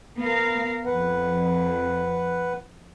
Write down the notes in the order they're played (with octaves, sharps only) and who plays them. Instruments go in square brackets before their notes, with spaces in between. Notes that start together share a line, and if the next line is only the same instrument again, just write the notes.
[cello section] B3 A#4 F5
[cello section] F2 [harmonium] B4 F#5